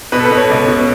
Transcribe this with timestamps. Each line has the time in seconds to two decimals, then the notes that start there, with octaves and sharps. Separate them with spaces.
0.12 B2 B4
0.20 A4
0.25 B4
0.31 B2
0.37 C#5
0.50 C#2
0.68 B2